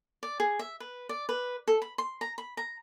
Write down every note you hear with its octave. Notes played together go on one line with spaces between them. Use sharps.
D5
G#4
E5
B4
D5
B4
A4
B5
C6
A#5
B5
A#5